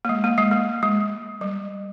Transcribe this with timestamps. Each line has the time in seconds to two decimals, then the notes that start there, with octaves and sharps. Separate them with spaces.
0.05 A#3
0.09 G#3
0.24 A#3
0.38 G#3
0.51 A#3
0.83 G#3
1.41 G3